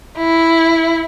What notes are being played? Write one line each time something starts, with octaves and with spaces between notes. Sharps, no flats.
E4